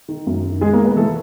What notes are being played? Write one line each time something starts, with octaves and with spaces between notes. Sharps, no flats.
D#3
F#2
D#3
G#3 G#4
A#3 A#4
G#3
B3 B4
E3 A3 A4